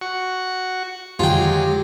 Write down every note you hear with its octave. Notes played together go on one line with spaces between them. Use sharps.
F#4 C#6
F2 D3 D#3 F#3 G#3 F4 G4 G5